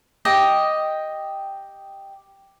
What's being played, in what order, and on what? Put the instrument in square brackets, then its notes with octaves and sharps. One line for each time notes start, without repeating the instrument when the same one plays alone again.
[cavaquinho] G4 D#5 G5